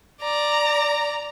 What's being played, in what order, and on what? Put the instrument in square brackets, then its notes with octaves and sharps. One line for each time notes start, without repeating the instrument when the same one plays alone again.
[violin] D5 A#5